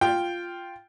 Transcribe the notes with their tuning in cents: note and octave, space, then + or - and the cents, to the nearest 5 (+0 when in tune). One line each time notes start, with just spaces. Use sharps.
F4 +0 G5 +0